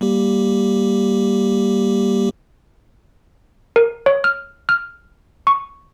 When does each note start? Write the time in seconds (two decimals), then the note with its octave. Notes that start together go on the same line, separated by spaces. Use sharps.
0.01 G3 A#3 G4
3.76 A#4
4.06 C#5
4.24 F6
4.69 F6
5.47 C#6